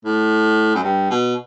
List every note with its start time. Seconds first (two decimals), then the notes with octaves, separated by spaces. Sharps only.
0.05 A2
0.75 F#2
0.83 G2
1.10 B2